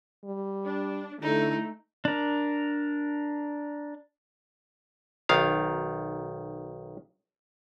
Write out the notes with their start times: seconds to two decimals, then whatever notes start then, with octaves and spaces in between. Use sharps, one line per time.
0.25 G3
0.66 D4
1.22 D3 A3 D#4 E4
2.05 D4 A#4
5.29 B1 D#3 F5